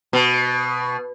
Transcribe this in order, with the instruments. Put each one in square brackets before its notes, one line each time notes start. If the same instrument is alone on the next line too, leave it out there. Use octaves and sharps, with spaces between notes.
[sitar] B2